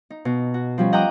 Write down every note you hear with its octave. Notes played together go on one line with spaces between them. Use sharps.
D#4
B2
F#4
F3 G3 C#4
D#5 F#5 G5 A#5 D6 D#6